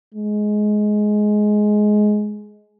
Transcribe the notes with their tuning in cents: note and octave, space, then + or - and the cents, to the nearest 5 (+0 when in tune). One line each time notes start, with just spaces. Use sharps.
G#3 +15